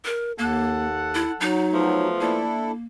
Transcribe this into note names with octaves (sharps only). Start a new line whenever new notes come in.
A#4
D#2 A#3 A4 F#5
E4
F#3 D#4
F3 A3 B3
A#3 D4 E4 A4